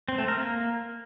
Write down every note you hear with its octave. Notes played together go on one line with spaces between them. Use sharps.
C4
A3
A#4
A#3